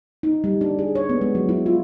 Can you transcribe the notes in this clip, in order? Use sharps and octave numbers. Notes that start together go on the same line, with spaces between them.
D#4
G3
D4
G#4
C#5
B3
G#3
F#3
E4
F4